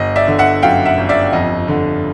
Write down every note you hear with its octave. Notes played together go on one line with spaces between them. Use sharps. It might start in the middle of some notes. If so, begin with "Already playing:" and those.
Already playing: G1 D#5
D5 E5
D3
E5 F#5
F#2 F5 G5
E5 F#5
G1
D5 E5
F2 D#5
D3